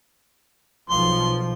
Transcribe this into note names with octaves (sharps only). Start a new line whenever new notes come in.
B1 F3 C6